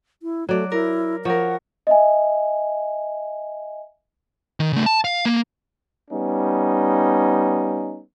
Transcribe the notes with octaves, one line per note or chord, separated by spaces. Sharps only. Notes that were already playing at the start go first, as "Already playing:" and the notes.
E4
F#3 A3 D5
E4 A#4
F3 A#4 C#5 F#5
D#5 E5 G#5
D#3
C#3 A3
A5
F5
A#3
G3 B3 C#4 D#4